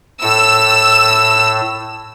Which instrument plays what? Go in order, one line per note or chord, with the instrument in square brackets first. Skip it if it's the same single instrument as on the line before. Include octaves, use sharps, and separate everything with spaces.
[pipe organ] A2 A4 [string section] E6